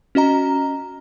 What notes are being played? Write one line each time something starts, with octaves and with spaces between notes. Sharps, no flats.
C#4 F#4 D#5 A#5